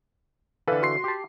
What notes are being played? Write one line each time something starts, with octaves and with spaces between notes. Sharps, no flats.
D3 E3 A4 B4 F5
F#4 C6 C7
G4 A5